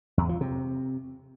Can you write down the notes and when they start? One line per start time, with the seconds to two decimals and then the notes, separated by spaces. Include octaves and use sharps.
0.17 E2
0.29 F3
0.41 C3